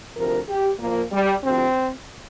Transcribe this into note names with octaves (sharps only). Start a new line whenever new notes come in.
D2 C3 F3 A#4
G4
A#2 F3 A#3
G3
D2 C3 F3 C4